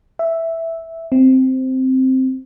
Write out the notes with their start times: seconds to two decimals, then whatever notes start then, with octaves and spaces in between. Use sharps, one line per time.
0.19 E5
1.12 C4